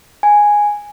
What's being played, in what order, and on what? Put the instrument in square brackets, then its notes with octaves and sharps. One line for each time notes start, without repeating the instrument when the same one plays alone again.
[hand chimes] G#5